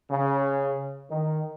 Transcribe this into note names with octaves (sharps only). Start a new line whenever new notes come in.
C#3
D#3